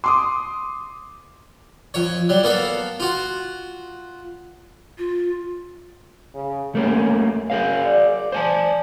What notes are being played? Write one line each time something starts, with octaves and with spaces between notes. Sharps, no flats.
C6 D6 D#6
F2 C#5
F#3 G3
A#3 B3 A4 F5
F4 F#4
F4
C#3
C3 A3 A#3 C#4
F#2
C#4 G#4 A#4 F5
D5
C5 G#5 A5